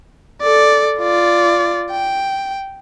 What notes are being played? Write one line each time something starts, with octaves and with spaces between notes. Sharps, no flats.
A4 D5
F4 D5
G5